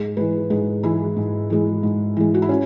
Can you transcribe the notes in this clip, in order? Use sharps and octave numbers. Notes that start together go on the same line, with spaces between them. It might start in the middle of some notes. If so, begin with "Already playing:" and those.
Already playing: G#2 G#4
E3 G#3 B4
G#2 G#4
E3 G#3 E4
G#2
E3 G#3
G#2
E3 G#3
F#4
E4
C#4